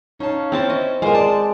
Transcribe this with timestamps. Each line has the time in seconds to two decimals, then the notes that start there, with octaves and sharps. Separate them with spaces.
0.20 C#4 D#4 F5 A5
0.52 C4 E4 C5 A5
0.70 D#5
1.02 G#3 B3 F4 A#4 C5
1.15 D5 A5